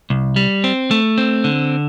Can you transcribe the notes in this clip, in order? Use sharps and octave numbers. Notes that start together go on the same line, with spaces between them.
C2
G3
C4
A3
C4
D3